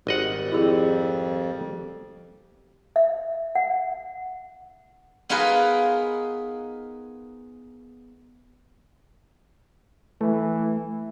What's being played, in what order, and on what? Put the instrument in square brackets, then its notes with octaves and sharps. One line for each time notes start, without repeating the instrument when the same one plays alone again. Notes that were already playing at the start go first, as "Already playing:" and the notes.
[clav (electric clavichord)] G#1 D#5 F#5 [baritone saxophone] G3
[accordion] F2 [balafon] E4 G4 G#4
[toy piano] E5
F#5
[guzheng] B3 D#4 F4 G#4 A#4 B4
[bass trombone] E3 [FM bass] A3